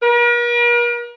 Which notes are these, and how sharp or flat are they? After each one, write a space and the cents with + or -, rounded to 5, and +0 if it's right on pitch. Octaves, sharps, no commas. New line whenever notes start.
A#4 +45